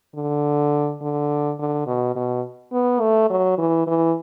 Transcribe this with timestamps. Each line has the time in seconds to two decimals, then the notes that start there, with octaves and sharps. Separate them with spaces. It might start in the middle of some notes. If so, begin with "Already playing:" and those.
0.15 D3
1.02 D3
1.59 D3
1.87 B2
2.16 B2
2.73 B3
3.01 A3
3.30 F#3
3.58 E3
3.87 E3